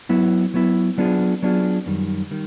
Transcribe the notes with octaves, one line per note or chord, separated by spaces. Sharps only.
F#3 B3 E4
F#3 B3 E4
F#3 B3 D4 F4 G#4
F#3 B3 D4 F4 G#4
F#2 D#3 G3
D#3 G3